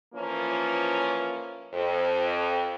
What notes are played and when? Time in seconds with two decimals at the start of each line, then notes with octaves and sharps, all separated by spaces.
0.14 E3 F3 A#3 C#4 F4
1.74 F2